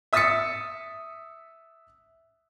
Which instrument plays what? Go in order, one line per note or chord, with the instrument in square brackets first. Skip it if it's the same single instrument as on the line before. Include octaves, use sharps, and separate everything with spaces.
[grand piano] E5 D#6 E6 A6 B6 C#7